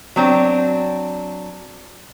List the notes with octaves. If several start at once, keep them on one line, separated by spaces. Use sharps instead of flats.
F#3 C4 D4